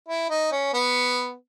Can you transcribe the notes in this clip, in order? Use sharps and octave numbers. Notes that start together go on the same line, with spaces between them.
E4
D#4
C#4
B3